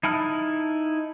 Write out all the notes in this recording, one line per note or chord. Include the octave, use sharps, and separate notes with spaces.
D#4 E4 A5 F6